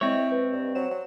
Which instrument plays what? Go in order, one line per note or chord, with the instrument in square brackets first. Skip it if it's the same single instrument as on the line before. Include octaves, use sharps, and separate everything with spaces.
[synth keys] G#3 C5 D#5 [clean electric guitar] C4 C#5 [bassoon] E4
[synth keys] B4 D#5 G5
[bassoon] G2
[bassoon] F#3 [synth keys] C5 E7
[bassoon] F#3